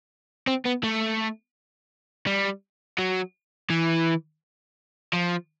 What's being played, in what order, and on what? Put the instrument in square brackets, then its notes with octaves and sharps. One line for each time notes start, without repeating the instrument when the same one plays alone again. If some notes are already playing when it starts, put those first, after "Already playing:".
[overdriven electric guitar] C4
B3
A3
G3
F#3
E3
F3